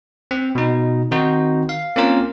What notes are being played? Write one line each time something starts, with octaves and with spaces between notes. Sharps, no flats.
C4
B2 D#4
D#3 C4 D#4 F#4 C5
F5
A#3 C4 C#4 F4 A#4